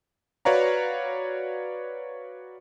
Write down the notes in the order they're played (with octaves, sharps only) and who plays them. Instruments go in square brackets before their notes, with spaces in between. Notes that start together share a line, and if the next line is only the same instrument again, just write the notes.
[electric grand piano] F#4 B4 C#5 D5 F5 A#5